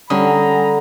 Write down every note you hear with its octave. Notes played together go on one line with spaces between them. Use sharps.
D3 G3 C#4 F#5 G#5 A#5 B5 D#6